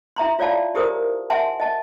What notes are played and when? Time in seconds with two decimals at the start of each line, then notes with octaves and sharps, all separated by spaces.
0.16 E4 E5 A#5 C6
0.39 F4 C#5 D5 F5 A5
0.74 E4 G4 G#4 A#4 C5 D#6
1.30 E5 F#5 G#5 A5 C6
1.60 D#5 A5